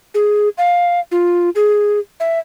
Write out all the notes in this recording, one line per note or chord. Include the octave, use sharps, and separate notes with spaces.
G#4
F5
F4
G#4
E5